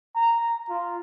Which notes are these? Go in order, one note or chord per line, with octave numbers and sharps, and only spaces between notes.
A#5
F4